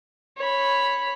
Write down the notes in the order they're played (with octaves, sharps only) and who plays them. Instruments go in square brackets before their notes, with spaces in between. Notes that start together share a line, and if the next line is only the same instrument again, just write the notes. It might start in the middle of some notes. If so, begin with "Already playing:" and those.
[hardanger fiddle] C#5 B5